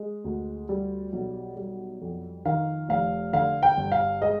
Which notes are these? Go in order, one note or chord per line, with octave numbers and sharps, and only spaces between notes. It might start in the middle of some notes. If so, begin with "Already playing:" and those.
Already playing: G#3
D2
G3
B1
G3
F2
D#3 F5
F1 F5
D3 F5
G5
G1
F5
G#3 D#5